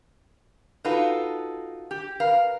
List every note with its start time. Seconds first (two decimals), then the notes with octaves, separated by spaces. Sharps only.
0.85 D#4 F4 F#4 A4 B4
1.91 G4
2.20 A#4 B4 F5